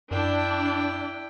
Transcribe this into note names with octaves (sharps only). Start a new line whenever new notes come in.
F#2 D4 E4 G5